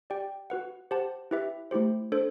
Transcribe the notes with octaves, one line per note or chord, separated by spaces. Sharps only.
G4 D5 G5
F#4 B4 F#5
G4 C5 F#5 A5
E4 G4 B4 E5
A3 E4 G4 C5
D4 A4 C5